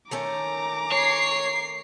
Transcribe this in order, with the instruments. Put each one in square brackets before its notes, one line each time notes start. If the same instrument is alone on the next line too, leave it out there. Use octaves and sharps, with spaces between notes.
[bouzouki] D#3 A3 C#4 [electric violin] A#5 D6
[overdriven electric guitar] C#5 [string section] C7